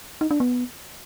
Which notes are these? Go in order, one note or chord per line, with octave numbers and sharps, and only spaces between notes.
D#4
D4
B3